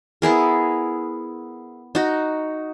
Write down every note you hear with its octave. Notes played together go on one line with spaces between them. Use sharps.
B3 E4 G#4 A#4
D#4 F#4